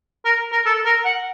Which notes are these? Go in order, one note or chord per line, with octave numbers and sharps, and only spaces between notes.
A#4
A#4
A4
A#4
F#5